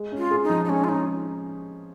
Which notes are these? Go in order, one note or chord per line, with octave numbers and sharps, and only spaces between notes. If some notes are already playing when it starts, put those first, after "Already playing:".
Already playing: G#3
C#4
F4
G#4
D#4
F3
D#4
G#3 C#4
F4
C#4 D#4